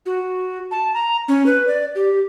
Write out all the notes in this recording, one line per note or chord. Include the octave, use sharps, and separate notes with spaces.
F#4
A5
A#5
C#4
B4
D5
G4